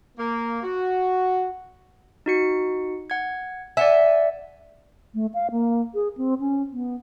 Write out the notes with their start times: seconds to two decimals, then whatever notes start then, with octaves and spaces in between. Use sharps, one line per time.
0.18 A#3
0.62 F#4
2.26 D#4 F#4 C#7
3.10 F#5 G#6
3.77 D5 E5 F#5 G#5
5.14 A3
5.34 F5
5.51 A#3
5.94 G#4
6.17 C4
6.40 C#4
6.72 B3